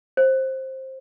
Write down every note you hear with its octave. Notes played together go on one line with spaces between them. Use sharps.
C5